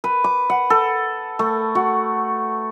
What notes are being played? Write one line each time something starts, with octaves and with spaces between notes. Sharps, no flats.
B4
D6
F#5
A4
A3
F#4